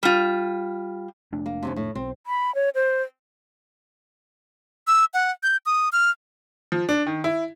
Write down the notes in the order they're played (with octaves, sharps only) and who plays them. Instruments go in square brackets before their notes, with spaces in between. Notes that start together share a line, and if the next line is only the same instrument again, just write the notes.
[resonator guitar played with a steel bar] G3 F4
[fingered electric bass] F1 A3 D4
[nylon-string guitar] A#3
D#2 A2 C3
A2
[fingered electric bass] B1 [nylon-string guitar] C4
[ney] B5
C#5
C5
[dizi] E6
F#5
G6
D#6
F6
[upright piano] F3
D4
D#3
E4